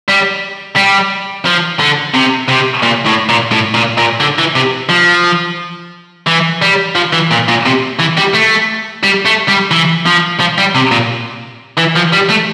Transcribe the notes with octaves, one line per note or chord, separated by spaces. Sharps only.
G3
G3
F3
D3
C3
C3
A#2
A2
A#2
A2
A#2
A#2
D3
E3
C3
F3
E3
G3
F3
E3
A#2
A#2
C3
E3
G3
A3
G3
A3
G3
E3
F3
F3
G3
C3
A#2
E3
F3
G3
A3